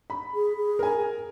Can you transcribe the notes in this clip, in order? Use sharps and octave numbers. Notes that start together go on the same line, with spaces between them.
B5
G#4
G#4
A#4 G#5